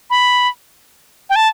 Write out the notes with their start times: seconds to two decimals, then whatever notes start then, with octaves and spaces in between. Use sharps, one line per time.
0.10 B5
1.30 G5
1.36 A5